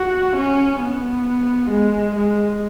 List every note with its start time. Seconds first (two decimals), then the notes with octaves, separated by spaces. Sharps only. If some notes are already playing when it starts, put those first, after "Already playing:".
Already playing: F#4
0.37 C#4
0.81 B3
1.70 G#3
2.16 G#3